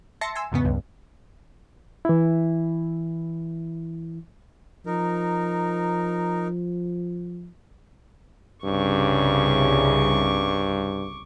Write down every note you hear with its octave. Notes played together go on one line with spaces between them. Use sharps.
E5 A5 C6 A6 A#6 C#7
G#5 C6 E6
E2 G#2 C#3 B3
C#2 G2
E3 E4
F3 D#4 A#4
C2 G2 C#3 C#6 D6